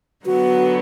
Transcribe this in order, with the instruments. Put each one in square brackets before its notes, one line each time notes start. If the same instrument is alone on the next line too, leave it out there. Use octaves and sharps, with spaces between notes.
[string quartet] D3 F#3 B3 [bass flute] F#4